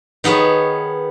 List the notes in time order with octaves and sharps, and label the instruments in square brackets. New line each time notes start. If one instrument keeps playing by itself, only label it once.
[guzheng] D#3 B3 G#4 C#5